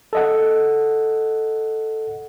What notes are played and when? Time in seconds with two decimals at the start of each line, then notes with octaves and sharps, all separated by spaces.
0.13 A4 D#5 F#5